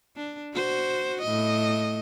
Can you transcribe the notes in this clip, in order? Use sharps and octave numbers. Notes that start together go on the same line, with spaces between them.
D4
F#4 C5
A2 D#5